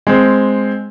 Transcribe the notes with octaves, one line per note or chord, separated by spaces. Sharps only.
G#3 C4